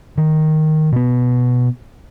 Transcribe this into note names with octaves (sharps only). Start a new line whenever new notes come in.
D#3
B2 B3